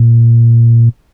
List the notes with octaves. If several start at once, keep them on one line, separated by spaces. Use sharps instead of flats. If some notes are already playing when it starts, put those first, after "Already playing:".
Already playing: A#2